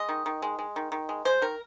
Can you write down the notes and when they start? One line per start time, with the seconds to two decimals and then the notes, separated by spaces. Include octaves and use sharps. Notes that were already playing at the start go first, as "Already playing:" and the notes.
Already playing: G#3 D#5
0.09 D#3
0.26 D#3
0.42 G#3
0.59 G#3
0.76 D#3
0.92 D#3
1.09 G#3
1.25 G#3 C5
1.42 D#3 A#4